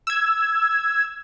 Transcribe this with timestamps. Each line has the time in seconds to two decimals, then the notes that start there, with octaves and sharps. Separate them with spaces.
0.07 E6 G#6